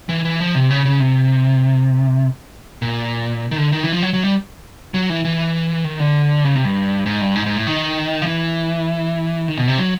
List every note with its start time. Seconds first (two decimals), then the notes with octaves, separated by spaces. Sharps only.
0.09 E3
0.25 E3
0.40 F3
0.55 C3
0.70 C#3
0.85 C#3
1.00 C3
2.82 A#2
3.51 D#3
3.58 D3
3.72 D#3
3.83 E3
3.92 F3
4.02 F#3
4.13 F#3
4.24 G3
4.94 F#3
5.10 E3
5.24 E3
5.84 D#3
6.00 D3
6.45 C#3
6.56 C3
6.65 G2
7.06 G#2
7.21 G2
7.35 G#2
7.46 G#2
7.56 A2
7.67 D#3
8.22 F3
8.26 E3
9.48 D#3
9.58 B2
9.68 C3
9.78 F#3